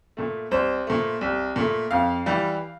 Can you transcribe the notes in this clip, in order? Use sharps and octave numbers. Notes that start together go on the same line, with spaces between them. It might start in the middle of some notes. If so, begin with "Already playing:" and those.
A#2 A3
C2 C5
A#2 A3
C2
A#2 A3
F2 F5
E3 G3